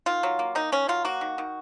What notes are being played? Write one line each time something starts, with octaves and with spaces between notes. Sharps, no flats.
D#3 F4
F#3
A#3
D#3 D#4
D#3 C#4
F#3 F4
A#3 F#4
D#3
D#3